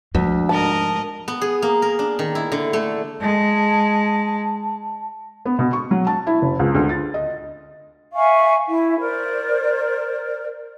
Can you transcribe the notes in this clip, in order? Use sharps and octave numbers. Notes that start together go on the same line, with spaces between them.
D2 F3 G#3
G#2 A#4 D#5 A5
B3
G#4
A#3
A#4
D4
D#3
E4
D3
A3
G#3 A5
B3
B2
C#6
F#3
A5
E4
F#1
C#2
D2
A6
D#5
E5 F5 G#5 C#6
E4 E5
A#4 C5 D5